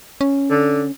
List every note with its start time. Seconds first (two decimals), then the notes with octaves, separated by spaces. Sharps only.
0.21 C#4
0.50 D3